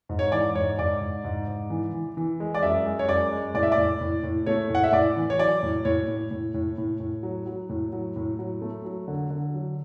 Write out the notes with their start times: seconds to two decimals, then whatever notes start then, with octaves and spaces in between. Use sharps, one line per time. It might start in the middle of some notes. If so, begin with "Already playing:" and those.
0.09 G#2
0.19 C#5
0.32 E3 D5
0.55 G#2 C#5
0.78 G#2 D5
1.01 G#2
1.24 G#2
1.47 G#2
1.70 E3
1.94 E3
2.17 E3
2.40 G#3
2.55 D5
2.62 F#2 E5
2.86 G#3
2.99 C#5
3.08 F#2 D5
3.31 G#3
3.54 A2 D5
3.63 E5
3.72 D5
3.78 A2
4.01 A2
4.23 A2
4.46 A3 C#5
4.70 A2 F#5
4.84 E5
4.92 A2 D5
5.17 E3
5.30 C#5
5.39 F#3 D5
5.63 A2
5.85 A2 C#5
6.08 A2
6.31 A2
6.54 A2
6.78 A2
7.00 A2
7.23 F#3
7.47 F#3
7.69 A2
7.93 F#3
8.16 A2
8.39 F#3
8.61 A3
8.84 F#3
9.08 D3
9.30 D3
9.54 F#3